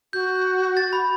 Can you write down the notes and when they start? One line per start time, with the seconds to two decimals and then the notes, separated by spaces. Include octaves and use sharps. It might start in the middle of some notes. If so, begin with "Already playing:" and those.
0.13 F#4 G6
0.77 A6
0.93 B5